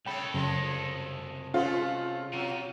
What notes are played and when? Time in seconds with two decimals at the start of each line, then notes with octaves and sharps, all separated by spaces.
0.06 C2 C#3 A3 A4 G5 B5
0.34 F#2 C#3 F3 F#3 G#3
1.54 F#3 G#3 A3 C#4 F4 C5
2.33 C3 F#3